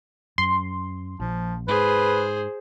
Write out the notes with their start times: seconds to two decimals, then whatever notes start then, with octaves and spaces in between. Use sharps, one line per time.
0.38 F#2 C6
1.20 A#1 F3
1.68 G#2 G#4 B4 C5